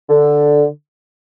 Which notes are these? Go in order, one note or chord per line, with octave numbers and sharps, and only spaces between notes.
D3